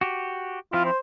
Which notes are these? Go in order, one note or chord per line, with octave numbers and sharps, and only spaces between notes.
F#4 G4
F3 C4 E4 F4
C5